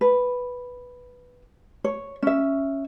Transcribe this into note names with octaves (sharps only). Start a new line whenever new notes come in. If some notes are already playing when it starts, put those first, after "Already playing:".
B4
C#5
C#4 E5